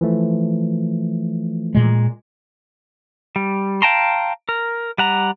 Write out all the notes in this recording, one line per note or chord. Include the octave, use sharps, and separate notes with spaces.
E3 F3 A3
A#2 G#3
G3
F5 G5 A5 A#5 C6
A#4
G3 F#5 A#5